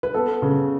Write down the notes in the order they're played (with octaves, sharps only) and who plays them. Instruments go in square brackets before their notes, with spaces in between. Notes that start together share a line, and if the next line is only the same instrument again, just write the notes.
[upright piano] B4
B3 A4
C#3